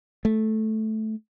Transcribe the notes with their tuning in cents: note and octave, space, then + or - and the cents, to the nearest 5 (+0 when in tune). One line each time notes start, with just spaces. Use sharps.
A3 -10